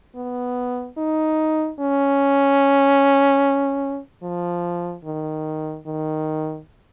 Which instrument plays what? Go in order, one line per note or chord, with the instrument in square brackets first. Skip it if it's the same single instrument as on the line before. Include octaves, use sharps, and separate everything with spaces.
[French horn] B3
D#4
C#4
F3
D#3
D#3